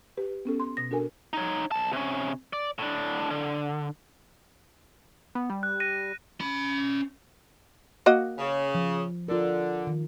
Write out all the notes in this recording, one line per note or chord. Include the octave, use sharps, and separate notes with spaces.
G4 B4
B3 C#4 A4
C6
B2 A#6
D4 F#4 A4 A#4 G#5
D#4 C#5
B1 A5
C3 C#4
D5
A2 D4
D3
B3
G3
F#6
A#6 D#7
C#4 B5
A#3 F#4 D#5
C#3
F3
D3 F4 A#4
D#3